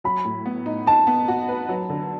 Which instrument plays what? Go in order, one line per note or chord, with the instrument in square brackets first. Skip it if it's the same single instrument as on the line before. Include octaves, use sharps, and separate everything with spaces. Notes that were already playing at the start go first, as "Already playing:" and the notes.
[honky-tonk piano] F#3 [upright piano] B5
[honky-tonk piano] A2
B3
D#4
[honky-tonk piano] D#4 [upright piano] A5
[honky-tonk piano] B3
F#4
B4
F#3
D3